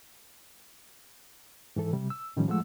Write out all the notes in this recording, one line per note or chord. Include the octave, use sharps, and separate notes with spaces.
G#2 E3 A4
C3 G3
E6
A2 D#3 F3 G3 C#4
F3 G#3 A3 F#5 E6